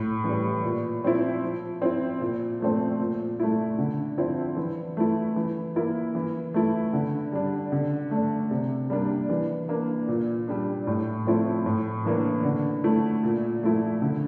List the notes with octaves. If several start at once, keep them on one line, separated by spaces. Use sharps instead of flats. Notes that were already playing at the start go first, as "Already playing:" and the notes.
Already playing: A2
E3
G3
A#2
F3 C4 E4
F3
C4 E4
A#2
F3 A3 C4
A#2
A3 E4
D3
F3 C4 E4
E3
A3 E4
E3
A#3 E4
E3
A3 E4
D3
G3 D4
D3
A3
D4
C3
G3 A#3 D4
E3
A#3 D4
A#2
G3 D4
A2
F3 A3 C4 E4
A2
E3 A#3 D4
D3
A3 E4
A#2
F3 A3 E4
D3